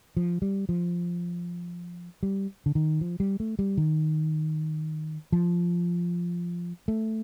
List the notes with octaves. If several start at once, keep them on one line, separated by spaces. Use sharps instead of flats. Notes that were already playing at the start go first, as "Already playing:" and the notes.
F3
G3
F3
G3
D3
D#3
F3
G3
A3
G3
D#3
F3
A3